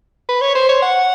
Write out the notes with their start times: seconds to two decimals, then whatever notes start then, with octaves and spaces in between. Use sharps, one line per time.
0.29 B4
0.41 C#5
0.55 C5
0.69 C#5
0.82 F#5